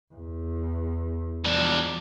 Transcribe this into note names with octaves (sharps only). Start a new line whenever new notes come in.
E2
E2 F3 D4